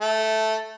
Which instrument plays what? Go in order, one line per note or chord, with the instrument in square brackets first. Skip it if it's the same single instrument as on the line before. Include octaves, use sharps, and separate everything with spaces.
[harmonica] A3